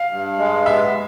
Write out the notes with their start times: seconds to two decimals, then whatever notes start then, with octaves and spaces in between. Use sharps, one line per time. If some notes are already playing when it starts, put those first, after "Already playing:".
Already playing: F5
0.11 G2
0.39 G#3
0.66 B3 E5